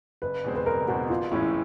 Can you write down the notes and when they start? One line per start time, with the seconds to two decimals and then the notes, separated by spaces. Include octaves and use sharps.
0.22 F#1 B4
0.44 E2 B2 G#3 C4
0.55 B4
0.66 F#1 A#4
0.88 E2 B2 G#3 C4 F#4
1.10 A1 F4
1.32 A2 E3 G#3 C#4 E4